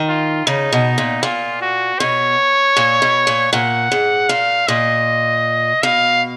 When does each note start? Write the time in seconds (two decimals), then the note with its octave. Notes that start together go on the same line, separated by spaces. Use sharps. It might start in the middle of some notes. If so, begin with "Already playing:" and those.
Already playing: D#3
0.08 F4
0.47 C#3 D#4
0.73 B2
0.98 A#2
1.23 A#2 F4
1.62 F#4
1.99 B2 C#5
2.77 A#2
3.02 B2
3.27 A#2
3.53 A#2 F#5
3.92 G#2
4.29 A#2 F5
4.68 A#2 D#5
5.83 B2 F5